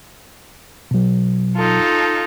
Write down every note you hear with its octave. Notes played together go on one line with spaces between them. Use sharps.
B2 F#3
D#4 F4 A4